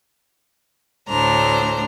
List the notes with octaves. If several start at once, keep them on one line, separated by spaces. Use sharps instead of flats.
D2 A2 D4 C5 A#5